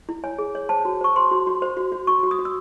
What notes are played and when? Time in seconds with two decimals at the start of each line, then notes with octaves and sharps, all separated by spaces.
0.09 E4
0.24 C#5 G#5
0.38 G#4
0.55 C#5
0.69 C5 A5
0.85 F#4
1.01 C5 C#6
1.16 C5 C6
1.31 F#4
1.47 F#4
1.62 C5
1.77 F#4
1.92 F#4
2.07 F#4 C#6
2.23 F#4
2.31 D#6
2.39 F#4
2.45 E6